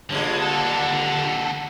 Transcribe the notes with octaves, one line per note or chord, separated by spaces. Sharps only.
G2 A#2 D3 G#3 C#5
D#2 A4 F#5